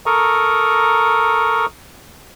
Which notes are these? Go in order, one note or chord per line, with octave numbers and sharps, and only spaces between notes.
A4 A#4 A#5 C#6 D#6